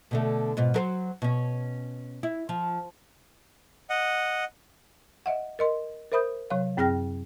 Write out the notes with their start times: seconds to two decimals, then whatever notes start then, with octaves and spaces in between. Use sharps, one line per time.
0.11 B2 D3 A3
0.57 G#2 B2 F4
0.74 F#3 A#4 C5
1.22 B2 C#4
2.23 E4
2.49 F3
3.90 D#5 F#5
5.26 D#5 E5 F#5
5.59 A#4 D#5 C6
6.12 A#4 C5 E5 B5 D#6 G6
6.50 C3 F#3 C#5 F5
6.77 F#2 C4 G#4 G5 F6 A#6